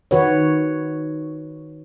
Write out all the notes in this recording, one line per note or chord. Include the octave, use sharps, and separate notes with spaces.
D#3 F#4 B4 C#5